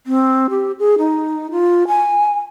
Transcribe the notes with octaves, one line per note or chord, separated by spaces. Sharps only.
C4
G4
G#4
D#4
F4
G#5